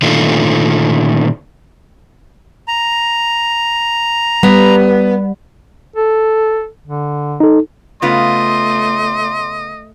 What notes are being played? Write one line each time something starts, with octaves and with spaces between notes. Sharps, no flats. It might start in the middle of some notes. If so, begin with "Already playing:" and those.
A#2 D3 D#3 A3 F4
A#5
G3 B3
A4
D3
D#4 A4
C#3 A3 B3 F4 D#5 C6